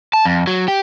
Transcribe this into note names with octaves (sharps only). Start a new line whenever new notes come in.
A5
F2
F#3
G4